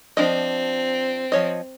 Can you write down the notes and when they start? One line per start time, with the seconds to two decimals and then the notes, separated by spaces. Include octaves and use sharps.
0.17 F3 C4 D4 D#5
1.32 F3 C#5 D#5